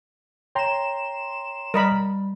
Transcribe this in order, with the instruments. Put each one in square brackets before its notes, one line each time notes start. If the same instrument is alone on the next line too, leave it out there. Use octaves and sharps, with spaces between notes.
[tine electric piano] C#5 G5 A#5 [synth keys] C6 E7
[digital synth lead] G3 [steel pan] A#4 D#5 B5